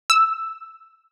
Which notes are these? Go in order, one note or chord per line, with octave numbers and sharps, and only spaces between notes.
E6